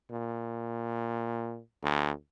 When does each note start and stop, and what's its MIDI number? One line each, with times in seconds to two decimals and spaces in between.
0.11 1.59 46
1.83 2.11 38